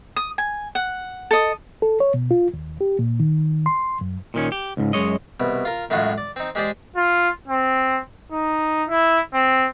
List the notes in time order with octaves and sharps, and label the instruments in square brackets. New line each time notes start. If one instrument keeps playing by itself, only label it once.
[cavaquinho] D#6
G#5
F#5
A4 D#5
[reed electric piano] A4
C#5
B2
F4
D#2
G4
A#2
D#3
C6
F#2
[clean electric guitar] A#2 D#3 C#4
G4
C#2 G#2
F#2 G#3 C#5 D#5
[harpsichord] C2 B2
F4 A#4
F#2 A2 G#3 F4 F#4
D5
C4 D#4
G#3 G4 G#4 C5 D5 D#5
[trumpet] F4
C4
D#4
E4
C4